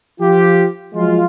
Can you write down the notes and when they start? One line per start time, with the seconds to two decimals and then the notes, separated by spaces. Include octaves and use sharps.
0.20 F3 F4 G4
0.94 F3 F#3 G#3 F4